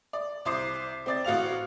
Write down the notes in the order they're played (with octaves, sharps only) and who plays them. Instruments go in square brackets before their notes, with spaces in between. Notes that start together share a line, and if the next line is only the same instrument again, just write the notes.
[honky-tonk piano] D5
C2 C5 D6 C7
C4 D5 A6
A1 F#4 F5 F7